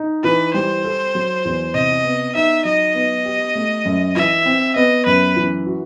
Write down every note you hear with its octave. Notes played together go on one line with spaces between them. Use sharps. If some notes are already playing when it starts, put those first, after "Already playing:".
Already playing: D#4
E3 B4
G3 C5
A4
F#3
E2
C3 D#5
B3
D#4 E5
F#3 D#5
B3
G4
A3
F#2
E3 E5
C4
B3 D#5
F#2 B4
E3
F#4